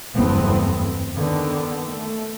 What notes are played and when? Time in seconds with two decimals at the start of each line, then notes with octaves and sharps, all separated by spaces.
0.14 F#1 E2 G2 A3 B3 C4
1.14 D3 D#3 B3
1.90 A3